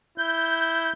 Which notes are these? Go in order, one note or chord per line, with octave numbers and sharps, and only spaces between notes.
E4 G6